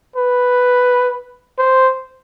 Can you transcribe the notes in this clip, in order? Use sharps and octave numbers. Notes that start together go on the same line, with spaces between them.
B4
C5